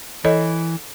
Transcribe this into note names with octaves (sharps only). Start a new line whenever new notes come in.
E3 A4 C#5 D#5